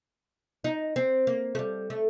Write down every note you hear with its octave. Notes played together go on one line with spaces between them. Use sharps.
D#4
C4
A#3
A3
G3
A3